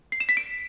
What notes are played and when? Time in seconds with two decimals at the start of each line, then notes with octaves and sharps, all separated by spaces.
0.12 C7
0.20 E7
0.29 B6
0.37 D7